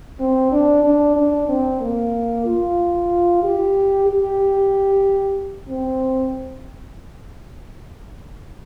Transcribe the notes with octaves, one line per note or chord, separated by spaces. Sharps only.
C4
D4
D4
D4
C4
A#3
F4
G4
G4
C4